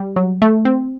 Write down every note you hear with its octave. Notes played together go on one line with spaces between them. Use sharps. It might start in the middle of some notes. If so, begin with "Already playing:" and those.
Already playing: G3
F#3
A3
C4